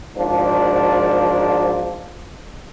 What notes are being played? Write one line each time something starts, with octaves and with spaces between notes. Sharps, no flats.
G#1 G#2 F3 D4